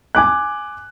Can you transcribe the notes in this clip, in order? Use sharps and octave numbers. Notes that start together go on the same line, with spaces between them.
G#5 D6 F#6